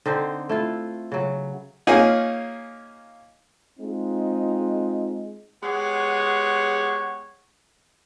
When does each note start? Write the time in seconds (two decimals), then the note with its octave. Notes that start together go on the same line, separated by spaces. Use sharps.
0.06 D3 C4 D#4 C5
0.49 A3 E4 F4
1.12 C#3 F#3
1.87 A#3 C#4 D#4 F4 G#4
3.79 G#3 C4 D#4 F4
5.63 G#3 B3 G4 G#4 C#5 F#5